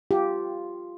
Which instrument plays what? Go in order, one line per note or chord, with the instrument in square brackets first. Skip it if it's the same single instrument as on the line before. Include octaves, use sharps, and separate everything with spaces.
[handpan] F4 [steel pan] G4